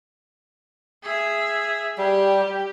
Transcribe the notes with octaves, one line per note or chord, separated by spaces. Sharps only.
G#4 E5
G3 G4